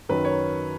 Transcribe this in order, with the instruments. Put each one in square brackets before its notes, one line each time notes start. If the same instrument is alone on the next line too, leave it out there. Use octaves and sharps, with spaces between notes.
[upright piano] F#2 D#3 F#3 B4
C#5